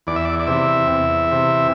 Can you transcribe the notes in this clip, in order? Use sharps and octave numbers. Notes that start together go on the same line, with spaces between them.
E2 D5
E5
D5
D5
C3 E3 E5
E2
C3 E3